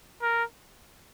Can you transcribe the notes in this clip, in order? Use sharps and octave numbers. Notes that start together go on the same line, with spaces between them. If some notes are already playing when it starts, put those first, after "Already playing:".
A#4